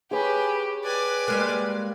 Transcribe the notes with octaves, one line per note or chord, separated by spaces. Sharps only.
G4 G#4 B4 C#5 G#5 B5
B4 D5 G5 G#5 F#6
G3 G#3 A#3